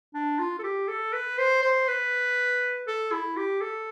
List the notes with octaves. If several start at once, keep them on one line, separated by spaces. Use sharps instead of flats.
D4
F4
A4
G4
A4
B4
C5
C5
B4
A4
E4
G4
A4